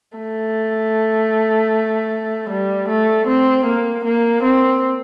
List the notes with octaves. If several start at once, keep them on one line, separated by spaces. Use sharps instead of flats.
A3
G3
A3
C4
A#3
A#3
C4